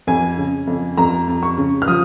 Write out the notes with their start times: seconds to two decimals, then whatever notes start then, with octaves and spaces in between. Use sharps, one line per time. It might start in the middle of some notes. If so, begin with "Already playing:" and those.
0.07 F2 G#5
0.38 C#3
0.67 F2
0.97 F2 A#5
1.28 F2
1.43 C#6
1.58 C#3
1.82 F6
1.88 F3 D#6